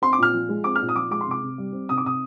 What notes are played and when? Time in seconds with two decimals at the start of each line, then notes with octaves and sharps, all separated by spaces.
0.02 C4 C6
0.13 D6
0.18 A#2 F6
0.34 F3
0.49 G#3
0.64 C4 D6
0.76 A#2 F6
0.89 D#6
0.96 F3 D6
1.11 G#3 D6
1.21 C6
1.26 C3 D6
1.43 C3
1.58 G3
1.73 C4
1.89 C3 D#6
1.98 D6
2.04 C3 D#6